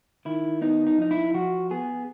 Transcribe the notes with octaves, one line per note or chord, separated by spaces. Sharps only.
D#3 E4
B3 D#4
D#4
F3 D#4
E4
F3 F#4
B3 G#4